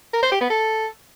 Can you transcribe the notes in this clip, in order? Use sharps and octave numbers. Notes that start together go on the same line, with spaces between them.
A#4
C5
G4
B3
A4